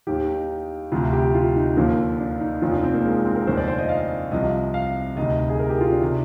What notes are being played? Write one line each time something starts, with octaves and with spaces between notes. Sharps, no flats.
D#2 D#3 G4
D#4
D2 C3 F3 F4
G4
F4
D#4
D#2 D3 F3 A#3
D4
D#4
F1 D#2 D#3 F4
D4
C4
A#3
G#3
C4
A#4
F1 D#2 D3 C5
D5
C5
D#5
F5
C2 C3 F3 D#5
F5
D2 C3 D#3 D#5
G#4
A#4
G4
F4
D4
C3 D#3